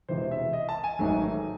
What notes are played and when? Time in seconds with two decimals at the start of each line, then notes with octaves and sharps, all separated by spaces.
0.08 E1 E2 C3 E3 G#3 C5
0.31 E5
0.53 D#5
0.69 A5
0.84 G#5
0.99 A1 G#2 D#3 F#3 A3